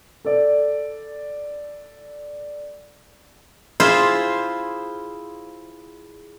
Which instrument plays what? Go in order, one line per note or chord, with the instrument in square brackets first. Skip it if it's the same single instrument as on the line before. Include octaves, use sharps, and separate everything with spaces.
[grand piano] A4 D5
[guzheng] E4 F4 G#4 C5 E5 F5